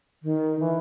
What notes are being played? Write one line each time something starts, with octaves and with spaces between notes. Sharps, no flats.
D#3
E3